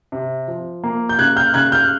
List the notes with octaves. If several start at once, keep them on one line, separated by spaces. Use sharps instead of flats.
C3
F3
A#3
G6
C#3 F#6 G#6
F6 G6
C#3 F#6 G#6
F6 G6